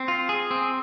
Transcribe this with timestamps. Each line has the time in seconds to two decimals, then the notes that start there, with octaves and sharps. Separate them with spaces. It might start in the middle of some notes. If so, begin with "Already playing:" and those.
Already playing: C4
0.08 F4
0.29 G#4
0.51 C4